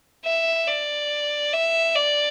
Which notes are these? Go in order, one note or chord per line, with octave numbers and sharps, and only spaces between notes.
E5
D5
E5
D5